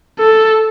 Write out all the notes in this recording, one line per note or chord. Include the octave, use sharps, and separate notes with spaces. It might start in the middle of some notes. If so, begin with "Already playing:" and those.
A4